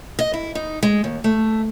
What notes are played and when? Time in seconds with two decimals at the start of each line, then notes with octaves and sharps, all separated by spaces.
0.19 D#5
0.34 E4
0.55 D#4
0.83 G#3
1.04 D#2
1.24 A3